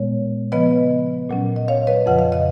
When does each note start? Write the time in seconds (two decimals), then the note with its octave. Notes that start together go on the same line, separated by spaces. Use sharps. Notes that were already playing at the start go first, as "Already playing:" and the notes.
Already playing: A#2 G#3 B3 C#5
0.52 C#3 F3 B3 B4 D#5
1.29 A#2 F#3 C#4
1.56 D#5
1.68 C#5 F5
1.87 B4 D#5
2.06 F2 C#3 F3 F#5
2.19 F5
2.32 D#5